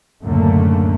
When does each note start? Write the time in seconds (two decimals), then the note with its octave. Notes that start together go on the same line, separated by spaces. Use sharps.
0.24 C#2 F#2 A2 D3 A3 A#3